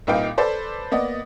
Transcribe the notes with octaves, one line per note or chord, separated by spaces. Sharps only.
C2 A#2 D#4 B4 F5 G5
A4 B4 C5 D5
A#3 B3 D5 D#5